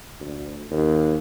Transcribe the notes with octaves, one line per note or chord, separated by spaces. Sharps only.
D2
D#2